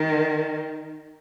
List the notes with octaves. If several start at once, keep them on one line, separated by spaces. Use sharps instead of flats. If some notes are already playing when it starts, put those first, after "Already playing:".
Already playing: D#3